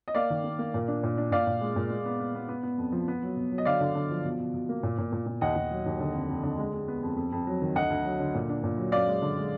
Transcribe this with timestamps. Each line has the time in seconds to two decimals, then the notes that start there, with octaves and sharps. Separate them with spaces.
0.08 D#5
0.15 A#3 D5 F5
0.30 D#3
0.44 A#3
0.59 A#3
0.74 A#2
0.88 D4
1.03 A#2
1.18 D4
1.31 A#2 D5 F5
1.47 A#2
1.61 G#3
1.76 A#2
1.90 G#3
2.05 B3
2.20 B3
2.35 B3
2.49 B3
2.63 B3
2.78 F2
2.92 F3
3.08 B3
3.23 F#3
3.37 B2
3.52 F#3
3.58 D#5
3.65 D3 D5 F5
3.81 D3
3.95 D3
4.10 F3
4.25 B2
4.40 B2
4.54 B2
4.69 A#3
4.83 A#2
4.98 A#2
5.12 A#2
5.26 A#2
5.41 D#2 D#5 F#5
5.56 D#2
5.71 F#3
5.86 D#2
6.00 D3
6.14 F2
6.29 F2
6.43 D3
6.58 G#3
6.74 G#3
6.88 B3
7.03 F2
7.17 F2
7.32 F2
7.47 F#3
7.61 D#3
7.75 D2 D#5 F#5
7.90 D2
8.05 F#3
8.20 D3
8.35 A#2
8.49 D4
8.64 A#2
8.78 F#3
8.92 F#2 D5 F5
9.07 G#3
9.22 D3
9.37 G#3